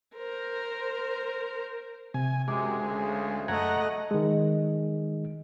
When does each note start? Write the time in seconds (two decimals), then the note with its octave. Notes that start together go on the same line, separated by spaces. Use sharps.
0.16 A#4 C5
2.14 C3 G#5
2.48 F#2 C3 G#3 G#5 D6
2.79 D2 C#3
3.48 F#2 A3 D#5 F#5 A#5 G#6
4.11 D#3 G#3